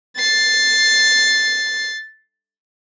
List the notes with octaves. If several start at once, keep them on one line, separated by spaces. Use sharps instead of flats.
A6 C7